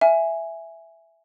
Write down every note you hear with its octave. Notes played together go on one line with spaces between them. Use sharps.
E5 G#5